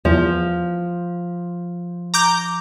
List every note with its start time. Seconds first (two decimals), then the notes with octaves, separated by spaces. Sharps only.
0.05 E2 F3
2.14 A#5 D6 G6